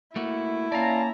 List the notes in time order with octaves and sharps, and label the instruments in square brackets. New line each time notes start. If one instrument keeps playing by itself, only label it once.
[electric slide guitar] A3 A#3 F#4 [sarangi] E4
[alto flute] A#3 [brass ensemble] C#4 A5 A#5 [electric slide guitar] D5 F5